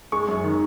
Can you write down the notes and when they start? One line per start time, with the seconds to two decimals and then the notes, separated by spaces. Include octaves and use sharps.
0.12 G#3 C#6
0.28 F#2
0.44 D#3